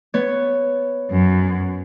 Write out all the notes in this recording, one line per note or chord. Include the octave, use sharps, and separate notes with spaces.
B3 C#5
F#2